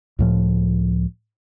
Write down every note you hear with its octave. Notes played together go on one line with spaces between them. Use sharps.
C#2 A2 F3